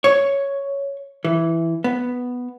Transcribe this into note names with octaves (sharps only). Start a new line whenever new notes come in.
C#5
E3
B3